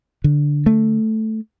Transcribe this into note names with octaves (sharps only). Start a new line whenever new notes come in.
D3
A3